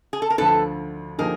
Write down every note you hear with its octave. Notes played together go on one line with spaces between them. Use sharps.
G#4
A4
A#4
D2 D3 F3 A4 B4
D3 F3 A#3 D#4 G4 G#4 A#4